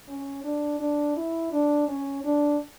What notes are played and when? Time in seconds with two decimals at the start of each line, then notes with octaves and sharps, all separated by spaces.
0.08 C#4
0.44 D4
0.79 D4
1.16 E4
1.52 D4
1.88 C#4
2.24 D4